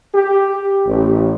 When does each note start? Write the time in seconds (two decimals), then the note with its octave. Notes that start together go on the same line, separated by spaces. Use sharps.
0.14 G4
0.85 A1